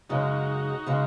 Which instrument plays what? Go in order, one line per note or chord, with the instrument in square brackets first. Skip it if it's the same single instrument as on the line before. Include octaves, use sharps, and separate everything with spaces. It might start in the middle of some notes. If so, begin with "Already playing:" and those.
[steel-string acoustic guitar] F#2 C#3 G#3 [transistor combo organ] D#4 F#4
[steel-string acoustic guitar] C#3 G#3